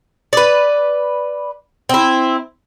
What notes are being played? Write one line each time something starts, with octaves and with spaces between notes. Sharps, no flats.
B4 D5
C4 E4